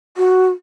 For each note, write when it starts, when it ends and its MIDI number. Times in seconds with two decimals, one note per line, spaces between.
0.17 0.50 66